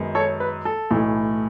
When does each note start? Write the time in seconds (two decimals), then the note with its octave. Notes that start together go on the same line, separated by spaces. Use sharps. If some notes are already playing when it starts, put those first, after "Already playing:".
Already playing: F#2 D#3 G#3 B3
0.15 A4 C#5
0.40 B4
0.65 A4
0.91 B1 A2 E3 A3